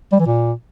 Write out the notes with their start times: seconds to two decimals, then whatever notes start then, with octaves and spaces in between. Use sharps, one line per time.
0.12 G3
0.19 E3
0.26 A#2